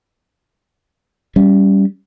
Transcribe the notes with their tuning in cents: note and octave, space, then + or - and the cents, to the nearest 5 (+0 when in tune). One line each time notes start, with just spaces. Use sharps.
G3 -5 C#4 +10